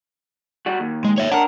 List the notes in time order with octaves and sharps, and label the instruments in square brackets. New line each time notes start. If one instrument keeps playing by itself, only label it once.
[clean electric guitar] G3 F#4
D#2
[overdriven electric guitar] G#3
C#5 E5
[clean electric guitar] D4 A#4 [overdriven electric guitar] F#5